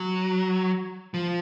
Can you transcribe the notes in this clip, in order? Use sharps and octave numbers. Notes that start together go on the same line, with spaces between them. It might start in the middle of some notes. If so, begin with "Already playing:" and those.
Already playing: F#3
F3